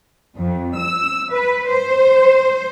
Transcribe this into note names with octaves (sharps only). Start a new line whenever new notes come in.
F2
E6
B4
C5